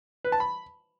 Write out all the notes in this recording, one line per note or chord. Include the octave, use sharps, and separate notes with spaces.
B4
A5
B5